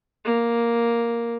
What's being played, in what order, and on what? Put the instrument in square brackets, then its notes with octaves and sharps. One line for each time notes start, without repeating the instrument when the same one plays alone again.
[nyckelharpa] A#3